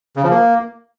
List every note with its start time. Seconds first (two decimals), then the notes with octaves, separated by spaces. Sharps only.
0.16 C#3
0.23 F3
0.31 A#3